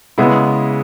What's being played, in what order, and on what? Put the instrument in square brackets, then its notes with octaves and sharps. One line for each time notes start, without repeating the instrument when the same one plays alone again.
[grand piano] C#3 G#3 B3 E4